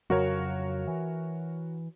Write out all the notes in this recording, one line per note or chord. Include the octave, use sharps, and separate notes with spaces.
F2 C#3 F#3 F#4 A#4 C#5
E3